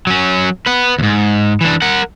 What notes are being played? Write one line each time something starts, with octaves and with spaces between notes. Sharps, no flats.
F#3 C#4
B4 F#5
D#2 G#2
E3 D4
A#4 F#5